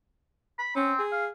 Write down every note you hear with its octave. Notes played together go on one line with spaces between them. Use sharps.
B5
C4 C#4
G#4
F5